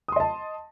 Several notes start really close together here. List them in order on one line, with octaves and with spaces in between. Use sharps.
D#6 C6 D#5 A5